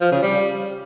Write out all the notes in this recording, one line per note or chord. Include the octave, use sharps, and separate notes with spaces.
F3
C#3
G3